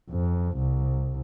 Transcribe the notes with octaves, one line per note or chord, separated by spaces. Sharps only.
F2
C2